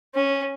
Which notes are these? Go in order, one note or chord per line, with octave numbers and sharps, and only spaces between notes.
C#4